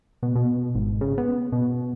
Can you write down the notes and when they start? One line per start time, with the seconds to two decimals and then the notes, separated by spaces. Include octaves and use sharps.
0.23 B2
0.35 B2
0.75 G#1
1.01 C#3
1.18 B3
1.52 B2